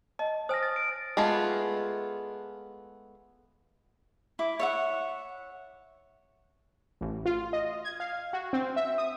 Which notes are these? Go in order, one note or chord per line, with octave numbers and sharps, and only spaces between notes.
D#5 A5
C5 G#5 D#6 F6 A#6
A6
D7
G#3 A3 B3 F4
E4 D6
C#5 E5 F#5
A1
F4
D#5
G#6
F5
F#4
C4
E5
D#6